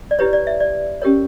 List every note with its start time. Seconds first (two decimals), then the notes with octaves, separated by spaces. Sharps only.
0.11 D5
0.19 E4 G4 B4 C#5
0.33 D5
0.47 E5
0.60 D5
1.02 C#4 G4 A#4 C#5